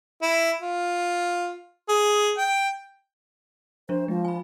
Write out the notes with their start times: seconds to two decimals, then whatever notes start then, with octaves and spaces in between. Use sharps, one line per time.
0.22 E4
0.62 F4
1.89 G#4
2.38 G5
3.89 F3 D4 C5
4.08 F3 G#3
4.25 G#5 B5